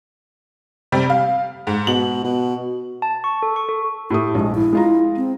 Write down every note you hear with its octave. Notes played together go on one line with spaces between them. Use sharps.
C3 G3
F5
G#2
B2 F#7
B2
A5
C#6
A4
C#6
A4
A2 A3 G4 D#6
A#1 G#3
E4
G#3 F4 A#5
C4